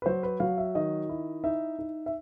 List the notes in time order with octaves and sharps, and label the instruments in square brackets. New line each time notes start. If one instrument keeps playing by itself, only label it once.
[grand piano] B4
F#3 C5
B4
F#3 F5
E5
D#3 D#5
E4
D#4 E5
D#4
E5